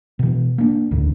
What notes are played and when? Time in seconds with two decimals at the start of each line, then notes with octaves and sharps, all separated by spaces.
0.19 B2 E3
0.58 A#3 D4
0.91 E1 A1 D2